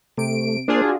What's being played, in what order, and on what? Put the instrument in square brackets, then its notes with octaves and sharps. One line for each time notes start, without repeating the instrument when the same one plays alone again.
[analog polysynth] C3 D7 [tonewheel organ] A3
[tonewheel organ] A#3 C5 [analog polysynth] D4 F4 G#4
[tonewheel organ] F#4